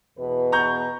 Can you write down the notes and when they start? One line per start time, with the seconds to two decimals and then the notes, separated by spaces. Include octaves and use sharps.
0.18 E2 B2 B4
0.52 A#5 C#6 G6